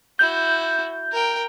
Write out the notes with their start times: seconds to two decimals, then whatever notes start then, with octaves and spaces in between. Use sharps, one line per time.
0.19 E4 F#4 G6
1.12 A#4 G5